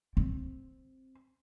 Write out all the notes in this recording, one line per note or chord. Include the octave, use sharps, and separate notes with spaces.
C4